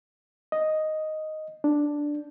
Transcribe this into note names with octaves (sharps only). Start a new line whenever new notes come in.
D#5
D4